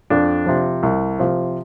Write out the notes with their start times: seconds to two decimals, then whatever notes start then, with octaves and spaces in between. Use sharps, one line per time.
0.10 F2 D4
0.46 C3 F3
0.83 C2
1.19 C3 F3